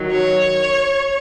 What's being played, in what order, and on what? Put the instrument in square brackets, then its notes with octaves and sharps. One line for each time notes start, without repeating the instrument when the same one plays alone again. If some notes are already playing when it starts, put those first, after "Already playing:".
Already playing: [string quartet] D#3 F#3
C#5